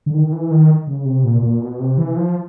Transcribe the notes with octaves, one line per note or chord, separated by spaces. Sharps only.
D3
D#3
E3
D#3
C#3
C3
A#2
A#2
B2
C3
E3
F3